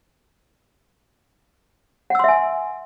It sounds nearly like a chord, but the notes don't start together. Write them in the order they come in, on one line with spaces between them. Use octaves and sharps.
F#5 E6 C6 E5 G#5